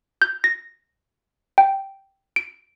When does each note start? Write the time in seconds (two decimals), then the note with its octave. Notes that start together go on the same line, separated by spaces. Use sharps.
0.22 G6
0.44 A#6
1.58 G5
2.36 D7